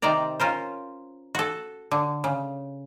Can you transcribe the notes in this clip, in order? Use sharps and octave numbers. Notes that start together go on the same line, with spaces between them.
C3 D#3 C5 D5 A#5
C#4 F4 A#4 C5
F#4 A4
D3
C#3